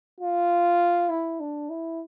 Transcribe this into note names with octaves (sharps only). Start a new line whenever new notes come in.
F4
E4
D4
E4